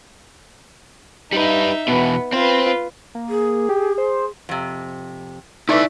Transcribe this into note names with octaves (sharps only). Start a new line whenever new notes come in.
G3 D#4 B4 E5
E2 B2 B3
C4 F4 B4 C5
A#3
G#4
G4
C5
F2 C3
A3 D#4 E4 B4 D5 E5 C#6 D6